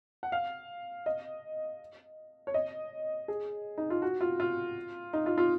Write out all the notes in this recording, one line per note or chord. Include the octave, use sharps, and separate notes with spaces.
F#5
F5
D#5
C#5
D#5
G#4
D#4
F4
F#4
F4
F4
D#4
F4
F4